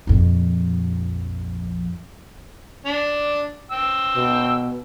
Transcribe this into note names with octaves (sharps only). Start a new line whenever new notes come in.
A#1 F2
D4
G5 E6
B2